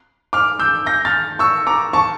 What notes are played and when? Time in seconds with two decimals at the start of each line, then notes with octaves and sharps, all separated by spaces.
0.33 D6 F6
0.59 E6 G6
0.86 G6 A#6
1.05 F6 A6
1.39 C#6 E6
1.67 A#5 D6
1.93 A5 C#6